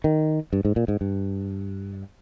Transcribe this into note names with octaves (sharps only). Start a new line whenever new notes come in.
D#3
G2
G#2
A#2
G#2
G2